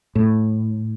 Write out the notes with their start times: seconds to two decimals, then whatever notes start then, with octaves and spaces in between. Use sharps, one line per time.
0.15 A2